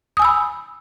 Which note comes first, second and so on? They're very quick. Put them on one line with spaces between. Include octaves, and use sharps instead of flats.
D#6 G#5 E6 B5